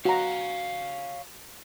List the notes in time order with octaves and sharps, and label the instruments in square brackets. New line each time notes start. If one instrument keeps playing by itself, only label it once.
[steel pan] F#4 A#5 [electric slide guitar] C#5 F5